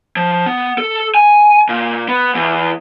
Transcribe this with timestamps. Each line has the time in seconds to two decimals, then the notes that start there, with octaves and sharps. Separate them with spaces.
0.16 F3
0.46 B3
0.78 A4
1.15 G#5
1.69 A#2
2.08 B3
2.34 E2